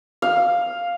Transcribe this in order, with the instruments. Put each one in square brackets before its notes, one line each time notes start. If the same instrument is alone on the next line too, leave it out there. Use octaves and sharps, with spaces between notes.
[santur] F5